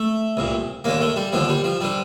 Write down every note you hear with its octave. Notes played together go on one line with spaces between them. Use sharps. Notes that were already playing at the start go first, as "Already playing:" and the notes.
Already playing: A3
C2 A#2
D#2 D3 A#3
A3
G3
D#2 D3 F3
G3
F3
D3 G3